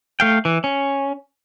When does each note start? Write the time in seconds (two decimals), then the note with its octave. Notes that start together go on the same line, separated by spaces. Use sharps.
0.20 A3 F5 G5
0.45 E3
0.64 C#4